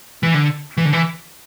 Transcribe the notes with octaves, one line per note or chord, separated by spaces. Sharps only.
E3
D3
E3
D3
E3